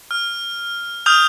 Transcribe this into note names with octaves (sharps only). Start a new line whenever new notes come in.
F6
D#6 F6 G6 F7